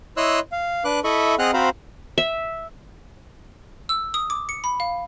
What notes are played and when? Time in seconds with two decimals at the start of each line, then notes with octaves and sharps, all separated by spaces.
0.17 E4 C#5 D#5 C6 E6 F#6
0.52 F5
0.85 D4 B4 D6 F#6
1.04 E4 A4 D#5 E5 B5 C#6
1.39 C4 G#4 D#5 F#5 F6 F#6
1.54 C4 F#4 C5 F5 A#5 B5
2.18 E5
3.89 E6
4.14 D#6
4.30 D6
4.49 C#7
4.64 B5
4.80 F5